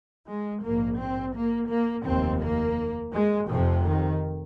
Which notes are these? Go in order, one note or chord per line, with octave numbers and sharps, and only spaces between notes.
G#3
A#1 G#2 A#3
C4
A#3
A#3
F1 D#2 C4
A#3
G#3
F1 F2 C3 F3
D#3